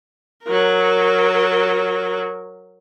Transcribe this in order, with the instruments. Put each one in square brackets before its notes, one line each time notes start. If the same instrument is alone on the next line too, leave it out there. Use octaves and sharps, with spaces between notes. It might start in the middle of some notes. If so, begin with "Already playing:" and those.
[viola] F#3 A#4